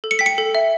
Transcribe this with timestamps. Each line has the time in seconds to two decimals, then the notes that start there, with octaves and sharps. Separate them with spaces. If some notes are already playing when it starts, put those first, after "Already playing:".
0.04 A4
0.11 C#7
0.19 G5 B6
0.26 C#7
0.38 A4
0.55 E5